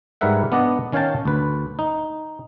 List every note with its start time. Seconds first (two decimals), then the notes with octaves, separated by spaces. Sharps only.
0.21 G#2 G3 A#4 B4 E5 F#5
0.52 B3 D4 D5 D#5 F#5
0.92 D#3 C#4 C#5 F5 G5 A5
1.25 D2 B4
1.79 D#4